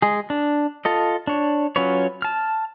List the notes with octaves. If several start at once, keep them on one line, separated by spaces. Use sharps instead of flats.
G#3 G#4
D4
F4 A4 D#5
D4 C#5
F#3 C#4 F4 B4 C#5
A5 F6